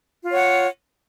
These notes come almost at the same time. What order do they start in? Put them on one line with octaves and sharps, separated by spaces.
F4 C#5 F#5